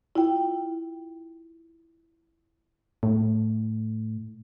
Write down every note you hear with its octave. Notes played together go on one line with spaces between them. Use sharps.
E4 F4 G5
A2